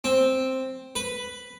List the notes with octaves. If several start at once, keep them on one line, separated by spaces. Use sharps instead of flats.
C4
B4